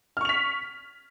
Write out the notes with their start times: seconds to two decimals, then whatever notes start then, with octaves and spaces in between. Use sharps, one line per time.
0.17 F6
0.21 C#6
0.25 F7
0.29 B6